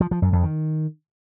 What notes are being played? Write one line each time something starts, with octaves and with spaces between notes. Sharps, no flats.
F3
F3
F#2
F2
D#3